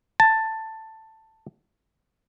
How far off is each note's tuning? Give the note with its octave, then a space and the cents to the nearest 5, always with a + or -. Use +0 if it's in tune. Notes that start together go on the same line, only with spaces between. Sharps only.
A5 +10